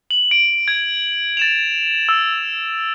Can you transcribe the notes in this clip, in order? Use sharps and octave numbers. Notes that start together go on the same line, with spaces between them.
F#7
D7
G#6
A6 E7 F7
E6